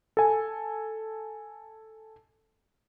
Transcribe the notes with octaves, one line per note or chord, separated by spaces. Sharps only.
A4 G#5